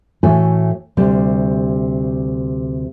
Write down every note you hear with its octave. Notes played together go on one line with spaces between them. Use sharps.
A2 E3 A3 F#4 A4 G#5
D2 C3 G3